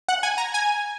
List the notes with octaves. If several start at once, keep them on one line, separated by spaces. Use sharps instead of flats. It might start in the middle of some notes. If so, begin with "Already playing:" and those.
F#5
G#5
A#5
G#5